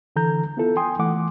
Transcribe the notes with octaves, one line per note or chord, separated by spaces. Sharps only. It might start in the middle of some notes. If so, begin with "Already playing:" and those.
D3 E3 A4 A#5 G6
B3 E4 F4 A4
G5 G#5 C6 D#6
E3 A3 F#5 D6